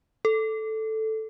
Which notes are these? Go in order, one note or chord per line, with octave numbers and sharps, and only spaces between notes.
A4